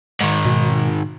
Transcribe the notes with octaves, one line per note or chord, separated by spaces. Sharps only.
G#2 D#3
B2